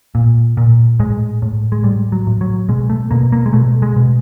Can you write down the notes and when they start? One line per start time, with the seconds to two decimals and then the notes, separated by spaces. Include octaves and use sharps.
0.15 A#2
0.57 A#2
0.99 A2 G#3
1.42 A2
1.72 G#3
1.83 A2 G3
2.12 F#3
2.27 A2
2.41 F#3
2.69 B2 G#3
2.90 A3
3.11 B2 A#3
3.32 A#3
3.46 G#3
3.53 B2 A3
3.82 G#3
3.96 B2